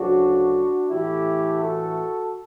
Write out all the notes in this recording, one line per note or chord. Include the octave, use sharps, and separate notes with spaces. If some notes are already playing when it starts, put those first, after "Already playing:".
Already playing: D2 C#3 F#3 D4 F#4
A2 E3 A3 E4 G4
F#4 A4